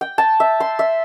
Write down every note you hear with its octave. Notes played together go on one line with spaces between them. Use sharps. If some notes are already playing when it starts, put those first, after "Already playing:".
G5
A5
E5
C6
E5